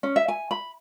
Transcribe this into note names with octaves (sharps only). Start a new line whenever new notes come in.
C#4
E5
G#5
B5